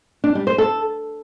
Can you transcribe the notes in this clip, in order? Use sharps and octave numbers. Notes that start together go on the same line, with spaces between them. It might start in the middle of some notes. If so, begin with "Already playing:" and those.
D4
G3
C5
A4